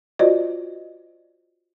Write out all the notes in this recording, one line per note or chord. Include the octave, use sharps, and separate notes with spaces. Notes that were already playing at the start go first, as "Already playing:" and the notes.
F4 F#4 C5 D5 D#5